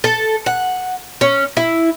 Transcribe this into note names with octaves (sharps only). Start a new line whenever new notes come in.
A4
F#5
C#4
E4